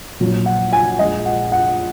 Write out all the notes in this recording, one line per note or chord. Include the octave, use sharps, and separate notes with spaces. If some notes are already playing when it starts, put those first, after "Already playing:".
A#1 A#2 F#3
F#5
G#5
A#1 A#2 G#3 D#5
F#5
F#5